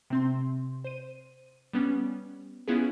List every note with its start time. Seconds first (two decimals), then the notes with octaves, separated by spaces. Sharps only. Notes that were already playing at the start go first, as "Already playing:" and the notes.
0.10 C3 C4 C6
0.84 C5 D#7
1.73 G3 B3 C#4
2.68 B3 C#4 E4 F4 G#4